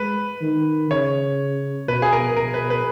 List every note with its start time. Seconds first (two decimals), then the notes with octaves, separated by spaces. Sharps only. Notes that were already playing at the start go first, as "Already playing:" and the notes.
Already playing: G#3 B4
0.41 D#3
0.90 C#3 C#5
1.88 B2 B4
2.02 G#4
2.13 A#4
2.36 B2 A#4
2.54 B4
2.70 B4